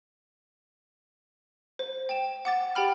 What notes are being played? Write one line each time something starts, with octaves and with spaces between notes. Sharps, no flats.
C5
G5 E7
F#5 D6 A6
G4 G5 B5 F6